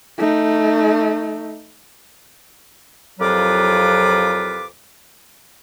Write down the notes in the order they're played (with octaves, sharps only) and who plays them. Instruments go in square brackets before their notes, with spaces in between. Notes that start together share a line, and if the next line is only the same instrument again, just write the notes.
[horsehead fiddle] A3 D#4
[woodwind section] C2 F2 F#3 F4 B4 D6